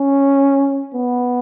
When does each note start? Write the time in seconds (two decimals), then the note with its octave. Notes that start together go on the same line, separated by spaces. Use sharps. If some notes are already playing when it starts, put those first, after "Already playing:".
Already playing: C#4
0.95 B3